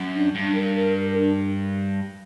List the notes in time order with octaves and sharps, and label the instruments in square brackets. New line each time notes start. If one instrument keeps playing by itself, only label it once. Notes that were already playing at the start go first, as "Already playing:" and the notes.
Already playing: [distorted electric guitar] F#2
[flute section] D4
[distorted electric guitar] G2 [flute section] D4
[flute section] A#4
A#4
A#4
D4